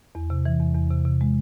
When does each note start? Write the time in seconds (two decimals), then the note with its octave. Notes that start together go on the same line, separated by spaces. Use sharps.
0.15 E2
0.30 C3
0.46 E3
0.59 E2
0.75 E2
0.90 C3
1.05 C3
1.21 G#3